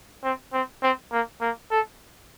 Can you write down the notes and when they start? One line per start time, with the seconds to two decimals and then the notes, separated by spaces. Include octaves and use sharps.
0.24 C4
0.53 C4
0.83 C4
1.12 A#3
1.41 A#3
1.71 A4